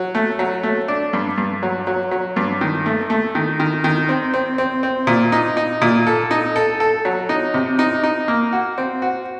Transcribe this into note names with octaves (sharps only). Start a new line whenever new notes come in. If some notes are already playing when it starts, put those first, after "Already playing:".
Already playing: F#3
A3
F#3
A3
D4
G2
G2
F#3
F#3
F#3
G2
D#3
A3
A3
D#3
D#3
D#3
C4
C4
C4
C4
A#2
D#4
D#4
A#2
A4
D#4
A4
A4
F#3
D#4
C3
D#4
D#4
A#3
F#4
C4
F#4